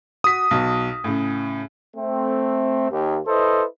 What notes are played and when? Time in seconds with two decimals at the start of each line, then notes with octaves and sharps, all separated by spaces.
0.24 F#4 D#6 B6
0.51 B1 B2
1.04 A2 C#3
1.96 A3 C4
2.91 D#2
3.27 E4 A4 B4 C5 D#5